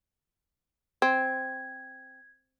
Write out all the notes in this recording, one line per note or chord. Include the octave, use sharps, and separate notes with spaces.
C4 G#6